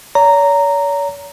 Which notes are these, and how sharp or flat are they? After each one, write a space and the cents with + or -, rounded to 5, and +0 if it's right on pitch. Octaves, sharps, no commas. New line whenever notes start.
C#5 +45 A#5 -10